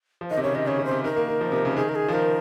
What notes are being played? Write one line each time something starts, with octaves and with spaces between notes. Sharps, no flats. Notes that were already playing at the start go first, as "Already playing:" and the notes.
F3
D#3 D#5
C3
C#3 C#5
D#3 D#5
C#3 C#5
C#3
C5
C3
D#3 A#4
A#3
D#3
F3
C3
C#3
D#3 G#4
A#4
G#4
F3
D#3 A#4